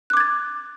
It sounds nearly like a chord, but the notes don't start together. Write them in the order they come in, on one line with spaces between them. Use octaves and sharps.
F#6 D6 G#6 A6